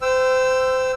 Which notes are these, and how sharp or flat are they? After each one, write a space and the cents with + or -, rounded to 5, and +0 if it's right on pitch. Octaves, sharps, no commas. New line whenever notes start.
C5 -25 G5 +0 E6 +10